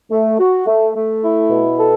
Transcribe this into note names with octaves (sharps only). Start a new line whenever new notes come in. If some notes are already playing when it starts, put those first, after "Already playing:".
A3
F#4
A3
A3
E4
B2
A4